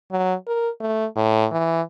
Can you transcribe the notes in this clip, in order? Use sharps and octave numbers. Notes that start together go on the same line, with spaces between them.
F#3
A#4
A3
A2
E3